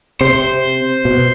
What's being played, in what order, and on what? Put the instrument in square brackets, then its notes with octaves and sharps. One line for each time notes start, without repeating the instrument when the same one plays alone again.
[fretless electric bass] C3 [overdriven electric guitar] C5
[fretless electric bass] B2